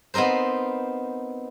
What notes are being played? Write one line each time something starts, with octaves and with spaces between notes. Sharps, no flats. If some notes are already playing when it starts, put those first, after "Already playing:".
B3 C4 D#4 A#4 C5